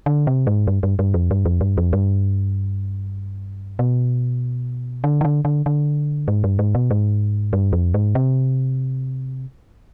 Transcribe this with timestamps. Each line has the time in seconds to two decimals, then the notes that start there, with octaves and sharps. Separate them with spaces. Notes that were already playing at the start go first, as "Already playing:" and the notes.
0.06 D3
0.27 C3
0.47 G#2
0.67 G2
0.83 G2
0.99 G2
1.14 F2
1.31 G2
1.45 F2
1.61 G2
1.78 F2
1.93 G2
3.79 B2
5.04 D3
5.21 D#3
5.25 D3
5.45 D3
5.66 D3
6.28 G#2
6.44 G2
6.59 G#2
6.75 B2
6.91 G#2
7.53 G2
7.73 F2
7.94 G#2
8.15 C3